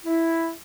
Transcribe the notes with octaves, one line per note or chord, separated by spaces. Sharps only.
E4